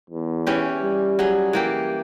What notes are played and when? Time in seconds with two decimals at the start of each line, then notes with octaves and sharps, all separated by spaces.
0.10 E2
0.47 E3 C#4 G4
0.83 G3
1.19 F#3 G#4
1.53 E3 A#3 G4